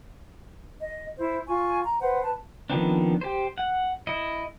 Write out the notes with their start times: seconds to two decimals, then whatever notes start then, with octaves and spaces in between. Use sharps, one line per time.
0.80 D#5
1.17 E4 C5
1.46 F4 G#5 C#6
1.83 A#5
2.00 B4 C5 F#5
2.22 B4 A5
2.70 D#3 F3 B3 C4 D4
3.21 G4 C5
3.58 F#5
4.07 E4 D#5